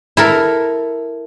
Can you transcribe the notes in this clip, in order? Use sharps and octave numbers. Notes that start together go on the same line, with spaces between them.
E4 A4 A#4